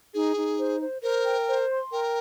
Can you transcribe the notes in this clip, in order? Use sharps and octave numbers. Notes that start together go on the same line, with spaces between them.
D#4 G#4
D#4
C5
C5
A#4 C5
G5
C5
C6
A#4 G5